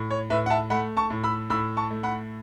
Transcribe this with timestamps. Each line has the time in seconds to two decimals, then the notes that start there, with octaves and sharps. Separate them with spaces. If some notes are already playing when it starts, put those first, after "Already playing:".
Already playing: A2
0.11 C#5
0.30 A2 B4 E5
0.46 F#5
0.50 E5 A5
0.70 A3 F#5 B5
0.97 A5 C#6
1.10 A2
1.24 B5 E6
1.50 A2 B5 E6
1.77 A5 C#6
1.90 A3
2.03 F#5 B5